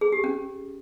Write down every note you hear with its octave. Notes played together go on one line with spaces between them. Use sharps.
G#4
G4
C#4